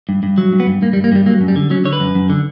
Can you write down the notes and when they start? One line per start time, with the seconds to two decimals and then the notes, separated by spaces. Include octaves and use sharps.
0.09 G2
0.23 G2
0.38 F#3
0.52 G2
0.60 B3
0.67 G2
0.82 G2 A#3
0.93 G3
0.97 G2
1.04 A#3
1.12 G2 G3
1.26 F#3 A#3
1.41 F#2
1.48 G3
1.56 D3
1.70 F#3 C#4
1.85 D3 C#5
1.93 B4
2.00 F#2
2.15 F#2
2.30 D3